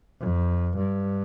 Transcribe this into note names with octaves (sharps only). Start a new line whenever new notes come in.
F2
G2